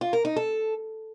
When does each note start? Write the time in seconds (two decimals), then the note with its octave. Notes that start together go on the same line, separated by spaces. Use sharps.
0.01 F4
0.13 A#4
0.25 D#4
0.36 A4